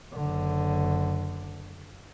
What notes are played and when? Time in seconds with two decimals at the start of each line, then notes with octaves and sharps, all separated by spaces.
0.13 F#1 D3